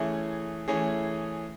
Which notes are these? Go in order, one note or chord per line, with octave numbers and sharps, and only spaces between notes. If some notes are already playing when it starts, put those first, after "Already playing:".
Already playing: E3 A3 C#4 G#4
E3 A3 C#4 G#4